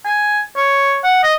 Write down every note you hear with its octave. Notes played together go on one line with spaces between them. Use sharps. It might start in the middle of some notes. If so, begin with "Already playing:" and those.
G#5
C#5
F#5
D#5